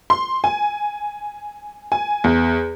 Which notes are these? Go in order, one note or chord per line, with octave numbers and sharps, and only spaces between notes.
C6
G#5
G#5
E2